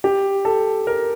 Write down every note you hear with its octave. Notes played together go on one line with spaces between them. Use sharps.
G4
A4
A#4